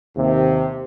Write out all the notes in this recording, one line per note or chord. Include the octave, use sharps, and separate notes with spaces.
D#2 C3